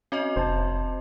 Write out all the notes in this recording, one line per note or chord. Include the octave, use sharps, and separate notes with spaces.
C4 C#4 F#4 D#5
F1 C5 A5